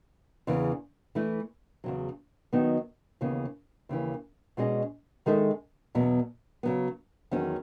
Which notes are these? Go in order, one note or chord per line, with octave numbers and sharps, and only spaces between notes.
E2 C#3 E3
E3 A3 E4
E2 C#3 F#3
D#3 F#3 B3 D#4
D#2 C#3 E3 B3
D#2 C#3 E3
B2 G#3 C#4 G#4 D#5
D#3 G#3 D#4 A4 E5
E2 B2 F#3 B3
C#3 F#3 B3
E2 D#3 F#3 C#4